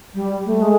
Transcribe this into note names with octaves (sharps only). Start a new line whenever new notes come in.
G3
A3
G#3